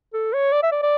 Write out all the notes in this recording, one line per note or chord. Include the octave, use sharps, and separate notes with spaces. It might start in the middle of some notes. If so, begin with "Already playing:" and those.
A4
C#5
D5
E5
D5
D5